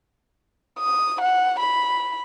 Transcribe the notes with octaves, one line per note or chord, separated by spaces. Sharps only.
D#6
F#5
B5